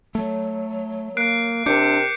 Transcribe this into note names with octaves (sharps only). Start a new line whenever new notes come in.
F#3 A3
A#3 F#6 C7 D7
C3 D4 A#4 D6 G6 C#7